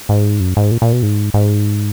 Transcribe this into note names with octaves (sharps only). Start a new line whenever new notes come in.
G#2
F#2
G#2
A#2
A#2
B2
G#2
G#2